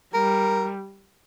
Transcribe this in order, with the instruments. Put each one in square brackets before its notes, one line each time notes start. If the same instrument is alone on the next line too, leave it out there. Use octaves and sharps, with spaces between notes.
[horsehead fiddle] G3 [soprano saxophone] A#4